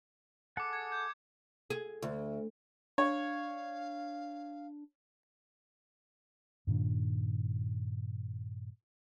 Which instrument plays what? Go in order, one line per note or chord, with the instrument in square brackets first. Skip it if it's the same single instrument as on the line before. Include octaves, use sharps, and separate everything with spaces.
[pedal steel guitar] G#4 A4 F#5 [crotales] D6 C#7
[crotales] G#6
G6
[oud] G#4
D2
[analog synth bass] D4 [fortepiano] C#5 [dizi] F5
[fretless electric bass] G2 A#2 D#3 D4